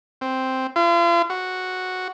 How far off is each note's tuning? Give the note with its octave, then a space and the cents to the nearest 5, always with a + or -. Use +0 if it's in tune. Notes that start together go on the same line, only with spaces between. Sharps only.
C4 +0
F4 -40
F#4 -5